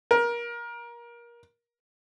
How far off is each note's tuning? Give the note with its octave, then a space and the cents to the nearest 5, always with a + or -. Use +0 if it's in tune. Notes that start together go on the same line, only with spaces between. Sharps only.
A#4 +25